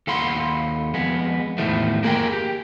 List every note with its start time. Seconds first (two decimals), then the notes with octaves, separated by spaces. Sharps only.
0.07 D#2 A4 F5 F#5 B5 C6
0.94 F2 G#3 B3
1.58 E2 A2 D#3 F3 A3
2.03 A#3 G#4 A#4 F#5 G5
2.33 G4